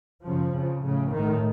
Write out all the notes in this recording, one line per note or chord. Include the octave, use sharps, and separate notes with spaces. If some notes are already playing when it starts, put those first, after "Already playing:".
F#2 C#3 F3
F2 C#3
A2 C#3
A2 D#3